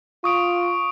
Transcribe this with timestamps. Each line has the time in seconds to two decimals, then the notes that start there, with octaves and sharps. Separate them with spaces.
0.24 F4 C#6 D#6 D7